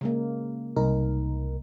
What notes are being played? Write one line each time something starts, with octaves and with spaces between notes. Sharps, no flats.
C#3 G#3 A#3
C2 D#4 A#4